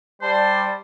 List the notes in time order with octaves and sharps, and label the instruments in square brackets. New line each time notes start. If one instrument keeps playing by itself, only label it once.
[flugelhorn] G3 [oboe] C5 [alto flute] D5 [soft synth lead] A5